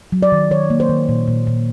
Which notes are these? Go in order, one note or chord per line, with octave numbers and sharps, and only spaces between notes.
F#3
D5
D#3
D#3 C#5
A#3
C5
D#3
A#2
A#2
A#2